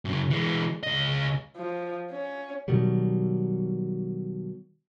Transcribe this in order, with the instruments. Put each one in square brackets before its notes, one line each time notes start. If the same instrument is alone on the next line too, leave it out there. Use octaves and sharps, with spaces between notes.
[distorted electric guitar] F#2 C#3
E3 G#3
C#2 D#5
[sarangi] F3
C#4
[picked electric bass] B2 D#3 F#3 G3